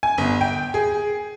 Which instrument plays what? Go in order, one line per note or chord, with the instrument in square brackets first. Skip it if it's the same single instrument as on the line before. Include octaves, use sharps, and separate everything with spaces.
[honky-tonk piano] G#5
G1
G5
G#4